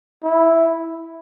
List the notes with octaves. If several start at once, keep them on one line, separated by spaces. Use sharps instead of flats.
E4